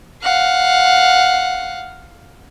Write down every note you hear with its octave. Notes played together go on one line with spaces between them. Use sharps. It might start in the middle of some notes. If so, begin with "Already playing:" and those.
F5 F#5